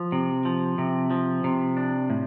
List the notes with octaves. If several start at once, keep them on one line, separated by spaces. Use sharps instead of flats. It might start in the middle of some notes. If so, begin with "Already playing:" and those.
Already playing: F3
C3
F3
C3
F3
C3
D4
A2